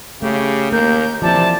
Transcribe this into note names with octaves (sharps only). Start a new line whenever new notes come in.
C#3 A3 G4
D#2 A#3 A#4 G6
C3 E3 F3 D5 A5